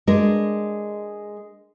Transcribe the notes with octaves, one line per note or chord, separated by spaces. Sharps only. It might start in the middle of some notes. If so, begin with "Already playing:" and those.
G#3 D4 A#4